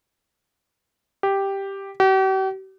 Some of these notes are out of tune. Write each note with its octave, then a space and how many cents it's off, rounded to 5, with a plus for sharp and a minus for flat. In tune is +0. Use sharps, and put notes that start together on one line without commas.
G4 +0
G4 -45